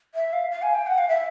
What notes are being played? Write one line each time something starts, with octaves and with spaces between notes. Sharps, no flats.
E5
F5
F5
G#5
G5
F#5
F5
E5